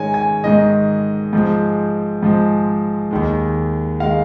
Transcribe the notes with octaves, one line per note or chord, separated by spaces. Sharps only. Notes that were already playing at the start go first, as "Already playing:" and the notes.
Already playing: G#2 D#3 G#3 C#5 G#5
G#5
G#2 D#3 G#3 D#5
G#2 F3 G#3
G#2 F3 G#3
D#2 D#3 G#3
D#3 G#3 F5